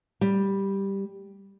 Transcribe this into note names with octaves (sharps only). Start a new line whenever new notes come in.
G3